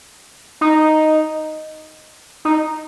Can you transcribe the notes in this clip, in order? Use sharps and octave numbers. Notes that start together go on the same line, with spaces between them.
D#4
D#4